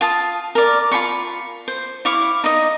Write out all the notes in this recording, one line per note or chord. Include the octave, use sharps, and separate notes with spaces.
F4 A5 D#6
A#4 D5
F4 A4 B5 C#6
C5
E4 F5 C#6 D6
D#4 D#5